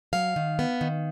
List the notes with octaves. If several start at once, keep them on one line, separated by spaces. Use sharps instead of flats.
F#3 F5
D#3
B3
D#3